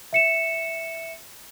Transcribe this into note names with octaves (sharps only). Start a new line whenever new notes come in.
E5 C#7 E7